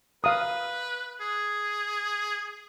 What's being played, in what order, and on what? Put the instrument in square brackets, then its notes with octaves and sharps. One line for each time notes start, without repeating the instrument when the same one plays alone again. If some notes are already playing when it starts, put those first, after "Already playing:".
[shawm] B4 [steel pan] F5 A#5 D#6
[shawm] G#4